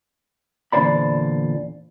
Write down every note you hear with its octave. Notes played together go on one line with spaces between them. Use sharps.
E2 A#2 D3 C5 D5 B5